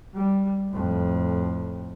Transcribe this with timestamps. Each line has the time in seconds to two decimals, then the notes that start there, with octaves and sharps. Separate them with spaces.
0.14 G3
0.70 F2 A2